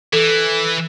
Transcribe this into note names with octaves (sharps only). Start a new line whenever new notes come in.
E3 A4